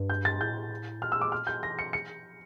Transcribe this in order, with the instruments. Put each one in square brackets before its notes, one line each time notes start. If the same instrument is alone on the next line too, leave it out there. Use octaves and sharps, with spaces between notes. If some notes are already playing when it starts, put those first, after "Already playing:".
Already playing: [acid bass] G2
[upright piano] G6
A6
[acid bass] A2 [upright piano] G6
[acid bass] A#2 [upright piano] F6
[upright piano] E6
D6
F6
G6
[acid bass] E3 [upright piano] A#6
[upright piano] C#7
C#7
[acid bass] F3